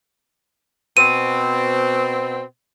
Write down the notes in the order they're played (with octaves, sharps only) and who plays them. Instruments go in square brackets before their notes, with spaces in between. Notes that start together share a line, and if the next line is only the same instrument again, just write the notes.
[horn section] B2 C4 [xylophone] D#7